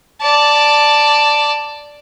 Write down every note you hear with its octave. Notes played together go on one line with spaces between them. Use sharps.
D5 A5